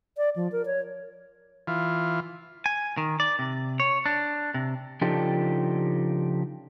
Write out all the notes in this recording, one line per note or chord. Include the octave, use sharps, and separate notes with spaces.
D5
F3
A#4
C#5
E3 F4
G#5
D#3
D5
C3
C#5
D4
C3
C#3 F3 D4 D#4 G4 A4